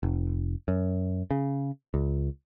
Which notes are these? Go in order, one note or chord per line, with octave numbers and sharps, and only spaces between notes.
F1
F#2
C#3
C#2